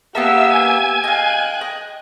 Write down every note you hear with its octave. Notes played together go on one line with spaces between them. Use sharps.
A#3 B3 G4 A#4 E5 E6
G#5
D#5 F5 G5 F#6
D#5